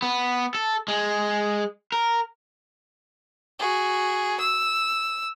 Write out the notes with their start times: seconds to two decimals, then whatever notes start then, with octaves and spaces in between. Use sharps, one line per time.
0.02 B3
0.55 A4
0.88 G#3
1.92 A#4
3.59 F#4 G#4
4.40 E6